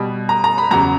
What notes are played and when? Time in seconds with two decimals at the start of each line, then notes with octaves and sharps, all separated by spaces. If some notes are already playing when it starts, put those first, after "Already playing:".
Already playing: B2 G3
0.29 A#5
0.44 A#5
0.58 B5
0.71 E2 C#3 F#3 A#5